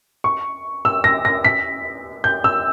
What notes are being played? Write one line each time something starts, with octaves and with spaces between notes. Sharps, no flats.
C#6
E6
A#6
A#6
B6
G6
E6